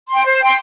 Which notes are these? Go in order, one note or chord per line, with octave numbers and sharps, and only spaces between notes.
G5 C6
C5
G5 C6